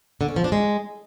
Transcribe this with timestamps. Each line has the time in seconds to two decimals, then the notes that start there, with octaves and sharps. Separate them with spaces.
0.21 D3
0.29 C#4
0.36 F3
0.44 D4
0.52 G#3